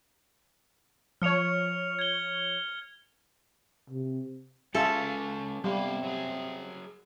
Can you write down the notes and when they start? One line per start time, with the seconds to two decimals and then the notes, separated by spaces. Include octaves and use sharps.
1.22 F3 C#5 F6 C#7 F7
1.99 G#6 G7
3.90 C3
4.75 G#3 C#4 F4 G#4 A4 E5 F5
5.64 C3 G3 B3 F5
6.03 F#3 G#4